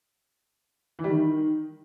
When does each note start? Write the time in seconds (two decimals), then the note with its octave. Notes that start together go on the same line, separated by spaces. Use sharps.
0.99 E3
1.04 G3
1.09 D#3